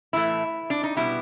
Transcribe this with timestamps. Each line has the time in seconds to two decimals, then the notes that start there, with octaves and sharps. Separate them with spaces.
0.13 A2 E3 A3 E4
0.70 D4
0.83 D#4
0.96 B2 G3 B3 E4